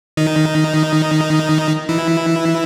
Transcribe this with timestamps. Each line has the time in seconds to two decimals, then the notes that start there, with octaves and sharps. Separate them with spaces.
0.17 D#3 D#4
1.89 E3 E4